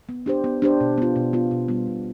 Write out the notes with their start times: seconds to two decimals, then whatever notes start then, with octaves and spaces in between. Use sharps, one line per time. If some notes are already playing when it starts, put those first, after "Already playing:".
0.09 B3
0.26 D4 G4 C5
0.44 B3
0.62 D4 G4 C5
0.80 B2
0.98 B3 F4
1.16 B2
1.33 B3 F4
1.51 B2
1.68 G3 B3
1.87 B2